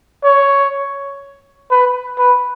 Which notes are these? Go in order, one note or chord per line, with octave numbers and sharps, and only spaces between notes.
C#5
B4
B4